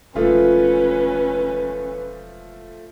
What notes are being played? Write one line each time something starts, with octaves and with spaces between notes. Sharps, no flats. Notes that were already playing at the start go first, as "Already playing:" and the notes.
E1 F3 A3 C#4 F4 B4